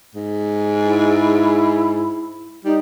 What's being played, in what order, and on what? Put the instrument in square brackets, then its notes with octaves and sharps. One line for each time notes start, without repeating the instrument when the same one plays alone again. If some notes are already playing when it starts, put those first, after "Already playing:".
[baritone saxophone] G#2
[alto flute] E4
[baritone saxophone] G3 [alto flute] D#4